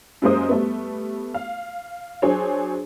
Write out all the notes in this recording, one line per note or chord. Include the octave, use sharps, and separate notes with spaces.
F#2 G3 G#3 A#3 C5 D#6
G3 A3 B3
F5
F#3 D4 G#4 C5 C#5